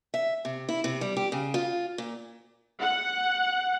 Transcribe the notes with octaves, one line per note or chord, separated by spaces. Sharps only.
E5
C3
E4
C3
G3
G4
C#3
F4
A#2
F#5